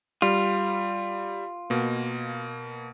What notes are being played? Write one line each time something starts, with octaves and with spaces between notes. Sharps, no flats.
G3 F4
B2 A#3